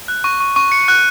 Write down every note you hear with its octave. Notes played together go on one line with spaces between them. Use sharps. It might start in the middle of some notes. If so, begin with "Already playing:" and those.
F#6
C#6
C#6
C#6
C#7
F#6